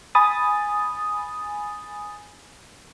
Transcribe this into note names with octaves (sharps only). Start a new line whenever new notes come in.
G#5 B5 D#6 A6